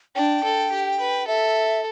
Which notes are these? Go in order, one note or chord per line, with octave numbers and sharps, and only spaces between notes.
D4 G5
A4
G4
B4
A4 E5